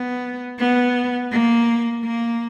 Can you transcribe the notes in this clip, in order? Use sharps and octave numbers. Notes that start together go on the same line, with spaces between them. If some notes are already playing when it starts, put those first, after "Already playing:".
Already playing: B3
B3
A#3
A#3